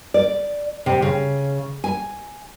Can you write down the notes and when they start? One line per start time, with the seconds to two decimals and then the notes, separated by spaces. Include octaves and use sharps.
0.14 D5
0.86 C3
1.02 C#3
1.84 G#5